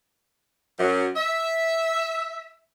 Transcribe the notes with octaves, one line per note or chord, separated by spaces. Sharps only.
F#2
E5